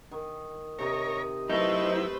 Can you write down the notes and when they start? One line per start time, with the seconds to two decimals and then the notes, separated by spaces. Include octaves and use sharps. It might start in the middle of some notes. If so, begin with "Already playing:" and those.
0.11 D#3
0.79 C3 D#4 A#4 C#5 D#5
1.50 F#3 A3 D#4 E4 B4 C5